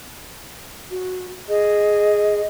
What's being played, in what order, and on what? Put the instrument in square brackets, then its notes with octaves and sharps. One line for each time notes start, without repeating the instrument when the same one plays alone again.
[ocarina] F#4
[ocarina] G#4 [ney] D#5